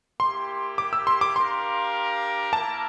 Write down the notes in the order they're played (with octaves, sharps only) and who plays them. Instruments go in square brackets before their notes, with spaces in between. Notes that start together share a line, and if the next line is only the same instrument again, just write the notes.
[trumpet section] A#3 E4 G4 [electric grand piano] C6
[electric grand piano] D6
E6
C6
D6
[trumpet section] D4 G4 A#4 F5 [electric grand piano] C6
[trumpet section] A#3 E4 A#4 [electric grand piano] A5